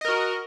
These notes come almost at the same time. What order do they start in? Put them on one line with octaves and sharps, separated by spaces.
D#5 A#4 F#4